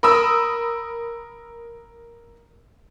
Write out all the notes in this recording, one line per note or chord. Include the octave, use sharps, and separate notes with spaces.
A#4 B5 D#6 E6